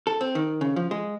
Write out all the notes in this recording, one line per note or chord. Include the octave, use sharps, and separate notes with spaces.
A4
C4
D#3
C#3
F3
G#3